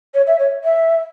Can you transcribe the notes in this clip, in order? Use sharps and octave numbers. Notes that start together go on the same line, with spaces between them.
C#5
E5
C#5
E5